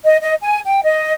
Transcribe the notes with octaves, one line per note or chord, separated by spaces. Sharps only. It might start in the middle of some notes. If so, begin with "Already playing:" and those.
D#5
D#5
G#5
G5
D#5